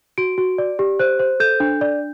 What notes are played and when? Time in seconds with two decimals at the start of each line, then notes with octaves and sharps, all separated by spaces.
0.18 F#4 D7
0.38 F#4
0.58 D5
0.79 G4
0.99 C5 F#6
1.19 C5
1.40 A4 G6
1.60 D4
1.81 D5